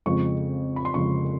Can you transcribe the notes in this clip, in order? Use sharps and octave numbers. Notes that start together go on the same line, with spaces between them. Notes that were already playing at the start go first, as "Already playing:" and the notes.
F2 C#3 F3 G#3 C#6
B5
C6
F2 C#3 F3 G#3 C#6